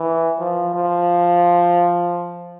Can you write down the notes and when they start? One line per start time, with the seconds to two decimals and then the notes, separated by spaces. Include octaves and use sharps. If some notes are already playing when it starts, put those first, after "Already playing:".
Already playing: E3
0.39 F3
0.74 F3